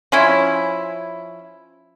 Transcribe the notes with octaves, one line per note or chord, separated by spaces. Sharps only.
F3 C#4 E4